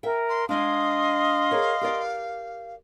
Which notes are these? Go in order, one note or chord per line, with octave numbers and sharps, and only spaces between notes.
A#4 E5 G5
C6
G#3 D4 D#5 F5 C6 D#6
G#4 A#4 C#5
G4 A#4 D5